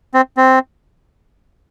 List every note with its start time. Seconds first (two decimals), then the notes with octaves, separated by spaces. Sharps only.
0.14 C4
0.37 C4